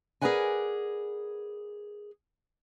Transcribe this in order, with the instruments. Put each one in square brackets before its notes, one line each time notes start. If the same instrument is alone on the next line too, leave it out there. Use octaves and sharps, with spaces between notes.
[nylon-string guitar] G#4 A#4 B4 D5 F#5 G#5